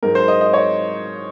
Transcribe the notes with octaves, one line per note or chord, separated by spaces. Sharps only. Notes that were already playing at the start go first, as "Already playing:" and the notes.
G#2 F#3 A#4
C5
D#5
D#5
C#5